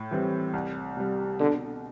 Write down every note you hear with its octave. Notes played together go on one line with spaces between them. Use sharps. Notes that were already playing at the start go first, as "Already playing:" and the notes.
Already playing: A2
E3 G3 C4
C2
C3 G3
B2 D3